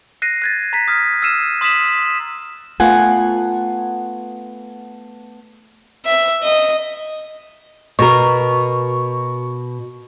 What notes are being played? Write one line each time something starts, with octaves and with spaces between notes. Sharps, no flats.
F#6 A#6 C7 D#7
F#6 G#6 A6
A#5 B6
D#6 F6 G#6 B6
E6 F6 C7 D#7 E7
C6 D#6 E6 B6 E7 F#7
A3 B3 F4 F#5 G#5
E5
D#5
B2 A#4 C#6